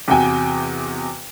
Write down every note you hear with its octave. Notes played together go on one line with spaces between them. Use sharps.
E2 C3 F#4 G5 G#5